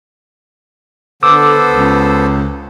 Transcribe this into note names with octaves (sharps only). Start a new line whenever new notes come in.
D3 B3 A4 C5 D6 E6
C#2